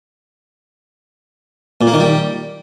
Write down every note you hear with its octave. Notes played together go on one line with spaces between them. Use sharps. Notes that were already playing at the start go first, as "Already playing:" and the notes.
A#2
A#3
D#3
G3